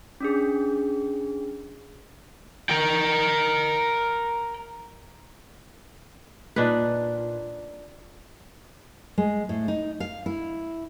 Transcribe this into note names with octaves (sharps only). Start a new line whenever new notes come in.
C#4 D4 G#4
A#4 G5
A#2 D4 D#4 B4
G#3
A2
D#4
F5
E4